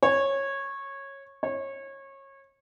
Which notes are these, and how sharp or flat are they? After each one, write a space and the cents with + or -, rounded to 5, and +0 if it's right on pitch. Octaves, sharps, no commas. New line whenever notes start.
C#5 -15
C#5 -25